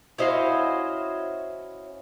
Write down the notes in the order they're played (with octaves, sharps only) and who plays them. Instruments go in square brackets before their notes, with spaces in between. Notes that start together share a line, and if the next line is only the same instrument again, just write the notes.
[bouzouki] C#4 F#4 C5 [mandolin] E4 D#5 F5